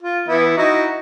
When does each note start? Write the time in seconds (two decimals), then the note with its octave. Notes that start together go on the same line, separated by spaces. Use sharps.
0.03 F4
0.28 E3 B3 E4
0.57 D#4 E4 F#4